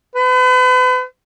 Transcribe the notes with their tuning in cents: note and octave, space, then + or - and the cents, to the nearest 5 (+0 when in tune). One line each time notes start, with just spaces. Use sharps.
B4 +40